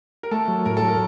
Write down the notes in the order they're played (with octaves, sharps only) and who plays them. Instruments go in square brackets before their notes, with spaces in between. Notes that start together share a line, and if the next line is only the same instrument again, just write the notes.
[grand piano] A#4
[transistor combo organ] A3 [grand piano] A4
[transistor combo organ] F#3
[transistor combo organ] A2 [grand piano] A#4
[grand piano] A4
[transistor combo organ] F#3
[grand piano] A#4